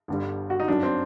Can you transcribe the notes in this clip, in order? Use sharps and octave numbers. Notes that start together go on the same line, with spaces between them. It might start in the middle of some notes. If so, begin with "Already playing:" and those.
G1 G2 D3 G3
F#4
D#4
G1 F#2 F#3 D4
C4